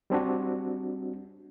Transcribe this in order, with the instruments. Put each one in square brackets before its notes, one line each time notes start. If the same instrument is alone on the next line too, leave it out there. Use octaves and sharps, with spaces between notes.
[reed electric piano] G3 C4 D4 F#4